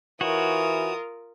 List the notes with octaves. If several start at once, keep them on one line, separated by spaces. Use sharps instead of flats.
E3 F4 F#4 A#4 C#5 D#6